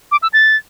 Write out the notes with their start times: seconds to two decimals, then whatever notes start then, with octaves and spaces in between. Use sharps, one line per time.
0.12 D6
0.23 E6
0.33 A6